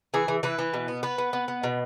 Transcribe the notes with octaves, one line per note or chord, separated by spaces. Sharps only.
E3 G#4
E3
E3 B4
E3
B2
B3
B3 B4
B3
B3
B3
B2